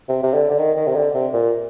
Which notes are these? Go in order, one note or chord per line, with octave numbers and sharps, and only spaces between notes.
C3
C3
D3
D3
D#3
D#3
C3
D3
C3
A#2